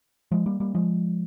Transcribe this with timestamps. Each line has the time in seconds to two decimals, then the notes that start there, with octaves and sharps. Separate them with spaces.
0.31 F3 G#3
0.46 G3 A#3
0.60 G3 A#3
0.75 F3 G#3